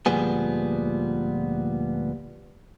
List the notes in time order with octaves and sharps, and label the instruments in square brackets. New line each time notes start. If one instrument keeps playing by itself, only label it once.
[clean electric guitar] D2 A#2 F3 G3 B3 G#4